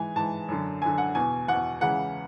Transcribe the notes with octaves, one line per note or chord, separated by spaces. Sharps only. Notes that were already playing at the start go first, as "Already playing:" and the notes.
Already playing: G#2 E3 G#5
G#2 E3 A5
F#2 D3
F#2 D3 G#5
F#5
E2 B2 G#5
E2 B2 F#5
C#2 C#3 E3 F#5